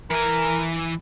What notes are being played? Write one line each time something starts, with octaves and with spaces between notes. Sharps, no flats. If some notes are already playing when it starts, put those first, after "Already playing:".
E3 A#4 G#5